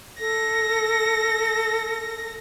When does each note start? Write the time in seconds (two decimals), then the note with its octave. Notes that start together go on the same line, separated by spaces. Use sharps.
0.20 A4 A#6